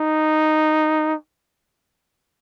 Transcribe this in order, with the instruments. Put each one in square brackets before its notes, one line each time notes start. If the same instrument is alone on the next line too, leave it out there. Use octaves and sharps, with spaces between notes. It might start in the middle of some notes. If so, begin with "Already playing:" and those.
Already playing: [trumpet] D#4